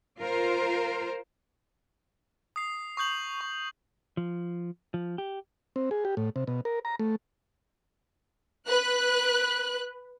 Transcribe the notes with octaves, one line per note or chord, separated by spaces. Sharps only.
F4 A#4 C5
D#6 C7
C#6 D#6 G6 F#7
C#6
F3
F3
G4
C4
G#4
G4
A2
C3
B2
A#4
A#5
A3
B4 F#6